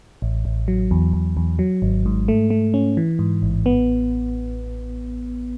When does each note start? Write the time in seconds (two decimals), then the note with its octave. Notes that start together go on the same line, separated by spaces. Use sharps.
0.22 A1
0.45 A1
0.68 F#3
0.91 E2
1.13 E2
1.37 E2
1.59 F#3
1.82 G#1
2.06 G#2
2.28 A3
2.50 A3
2.74 C#4
2.97 E3
3.19 G#2
3.42 A1
3.66 B3